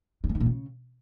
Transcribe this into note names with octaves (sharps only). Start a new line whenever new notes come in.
D#3
E3
D#3
A#2
C#3